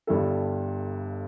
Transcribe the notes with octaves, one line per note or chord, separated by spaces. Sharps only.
G1 G2 G3 E4 A4